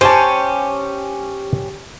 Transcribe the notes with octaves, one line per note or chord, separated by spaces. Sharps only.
C#4 G4 C5 G#5 A5